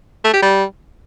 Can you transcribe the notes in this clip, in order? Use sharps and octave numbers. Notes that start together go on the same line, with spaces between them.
A3
G4
G3